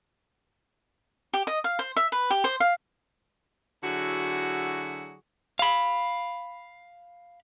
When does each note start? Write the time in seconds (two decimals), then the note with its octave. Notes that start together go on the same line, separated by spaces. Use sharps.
1.34 G4
1.47 D#5
1.64 F5
1.79 C5
1.97 E5
2.12 B4
2.30 G4
2.44 C5
2.60 F5
3.83 D3 F#3 E4 F#4 G#4
5.59 F5 B5